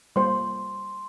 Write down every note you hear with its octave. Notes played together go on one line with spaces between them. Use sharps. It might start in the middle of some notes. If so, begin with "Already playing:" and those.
G3 A#3 F4 C5 C6